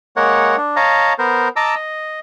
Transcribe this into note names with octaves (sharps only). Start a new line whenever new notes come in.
G#3 A#3 A#4 C#5 F#5
D4
C#5 D#5 F5 A5 A#5
B3 A#4 C5
D#5 A5 A#5 D6 E6
D#5